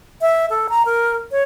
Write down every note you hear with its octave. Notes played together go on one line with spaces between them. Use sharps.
E5
A4
A#5
A#4
C#5